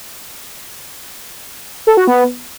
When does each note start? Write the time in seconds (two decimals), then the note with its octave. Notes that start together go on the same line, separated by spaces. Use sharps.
1.87 A4
1.97 F#4
2.07 B3